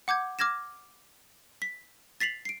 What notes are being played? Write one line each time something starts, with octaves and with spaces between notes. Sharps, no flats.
F#5 D6 G6 G#6
D6 F6 G#6 A#6 E7
B6
A6 B6 C7 F7 F#7
C7 D7